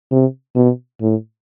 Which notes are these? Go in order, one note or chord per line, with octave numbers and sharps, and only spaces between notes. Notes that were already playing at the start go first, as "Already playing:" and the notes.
C3
B2
A2